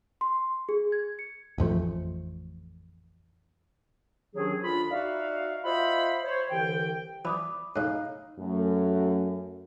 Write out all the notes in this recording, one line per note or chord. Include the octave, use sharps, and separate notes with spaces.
C6
G#4
G#6
C#7
A1 F2 F3 A3
C3 D#3 F#3 C#4 D4 G#4
D2 D4 F4 B5
D#4 F#4 D5 E5 F5
F4 C5 D#5 E5 F#5 B5
C5 C#5
C2 D3 E3 G5
E3 D5 B5 D6 D#6
A2 C#3 D#4 F5 F#6
F#2 A3